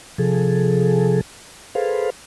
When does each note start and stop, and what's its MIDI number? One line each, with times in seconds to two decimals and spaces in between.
0.18 1.21 48
0.18 1.21 53
0.18 1.21 68
0.18 1.21 69
1.75 2.10 68
1.75 2.10 69
1.75 2.10 71
1.75 2.10 72
1.75 2.10 77